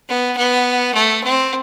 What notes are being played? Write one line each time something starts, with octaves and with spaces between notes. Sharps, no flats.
B3
B3
A3
C4